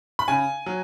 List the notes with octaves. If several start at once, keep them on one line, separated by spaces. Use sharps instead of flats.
B5
C#3 G#5
F#3